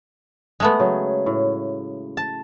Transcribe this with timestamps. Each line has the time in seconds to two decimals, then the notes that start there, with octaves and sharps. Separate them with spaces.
0.60 G#3 A3 B3
0.80 C#3 F#3
1.26 A2
2.17 A5